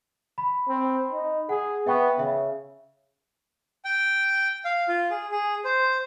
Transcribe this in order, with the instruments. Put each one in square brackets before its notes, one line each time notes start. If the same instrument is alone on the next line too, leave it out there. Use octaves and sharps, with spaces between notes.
[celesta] B5
[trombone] C4
D#4
[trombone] G#4 [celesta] F#5
[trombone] B3 [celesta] E5 G5 C#6
[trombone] C#3 [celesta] E5
[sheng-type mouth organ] G5
F5
F4
G#4
G#4
C5